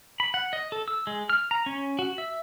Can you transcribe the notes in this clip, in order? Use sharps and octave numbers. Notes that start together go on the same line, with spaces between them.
B5
F#5
D#5
A4
E6
G#3
F6
A#5
C#4
F#4
E5